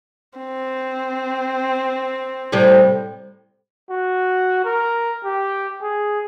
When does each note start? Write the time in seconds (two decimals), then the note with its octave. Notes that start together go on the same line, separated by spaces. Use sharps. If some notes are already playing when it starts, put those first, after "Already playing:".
0.39 C4
2.52 A2 C3 G3
3.90 F#4
4.65 A#4
5.25 G4
5.82 G#4